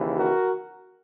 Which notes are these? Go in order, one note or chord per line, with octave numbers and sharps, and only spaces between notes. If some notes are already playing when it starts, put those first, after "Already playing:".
Already playing: D#2 C#3 E3
F#4 A#4